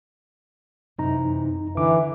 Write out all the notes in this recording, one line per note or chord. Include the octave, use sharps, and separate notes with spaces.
F#2 C3 E3 D#4 A#5
D3 E3 D6